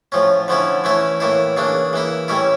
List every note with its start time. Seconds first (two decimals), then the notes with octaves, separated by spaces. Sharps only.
0.12 A2 F3 C#4
0.48 D3 F3 C#4 E4
0.84 E3 A3 C#4 E4
1.20 A2 E3 A#3 E4
1.57 C#3 E3 A#3 D4
1.93 E3 A#3 E4
2.28 A2 G3 C#4 E4